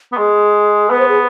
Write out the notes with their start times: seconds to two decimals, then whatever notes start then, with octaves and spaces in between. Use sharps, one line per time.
0.12 B3
0.17 G#3 G#4
0.90 B3 B4
0.99 C5
1.08 G#4